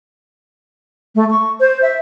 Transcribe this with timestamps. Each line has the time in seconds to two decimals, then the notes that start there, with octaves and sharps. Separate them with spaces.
1.15 A3
1.30 C#6
1.60 C5
1.82 E5